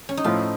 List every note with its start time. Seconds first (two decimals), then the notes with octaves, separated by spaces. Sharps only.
0.09 C#4
0.17 D#4
0.24 A2 F3 A3 F4